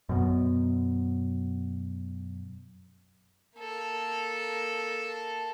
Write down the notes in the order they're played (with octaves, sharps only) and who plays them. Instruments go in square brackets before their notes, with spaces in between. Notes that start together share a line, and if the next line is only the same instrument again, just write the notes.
[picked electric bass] F#2 B2
[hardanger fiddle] A#3 A4